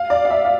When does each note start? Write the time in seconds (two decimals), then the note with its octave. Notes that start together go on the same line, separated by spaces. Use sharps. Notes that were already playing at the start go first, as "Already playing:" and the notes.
Already playing: F5
0.10 D5
0.25 F5
0.30 E5
0.45 F5